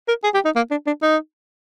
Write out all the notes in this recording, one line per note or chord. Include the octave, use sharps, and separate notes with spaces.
A#4
G#4
G4
D#4
A#3
D4
D4
D#4